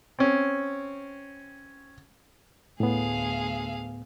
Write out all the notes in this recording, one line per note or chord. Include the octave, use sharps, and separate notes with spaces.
C4 C#4
D2 A2 B3 G#4 F5